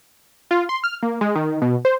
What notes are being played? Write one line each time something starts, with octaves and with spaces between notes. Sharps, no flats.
F4
C6
F6
A#3
G#3
D#3
B2
C5